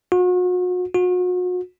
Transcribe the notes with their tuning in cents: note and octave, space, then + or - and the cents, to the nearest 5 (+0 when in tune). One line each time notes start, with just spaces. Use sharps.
F#4 -40
F#4 -40